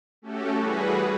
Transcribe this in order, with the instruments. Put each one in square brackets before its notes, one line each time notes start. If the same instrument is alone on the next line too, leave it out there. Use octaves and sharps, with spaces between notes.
[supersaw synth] A3 C#4 F#4 G4 A4
E3 G3 F#4 G#4 B4